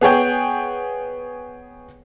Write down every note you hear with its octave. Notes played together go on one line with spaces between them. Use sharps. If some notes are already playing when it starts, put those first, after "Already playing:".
B3 G#4 C#5 G5